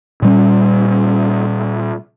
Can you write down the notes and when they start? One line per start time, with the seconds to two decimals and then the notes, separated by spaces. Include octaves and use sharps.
0.22 A#2 G3 C#4